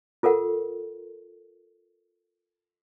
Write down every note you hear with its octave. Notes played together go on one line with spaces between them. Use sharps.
F4 A4 A#4 F#5